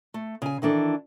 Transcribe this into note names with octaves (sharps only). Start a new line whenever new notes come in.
A3
C#3 G#5
D#3 E3 D4 A4